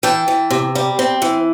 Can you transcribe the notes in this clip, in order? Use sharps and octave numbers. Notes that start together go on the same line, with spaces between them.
E3 G5 A5
E3
C3
G3
C4
E3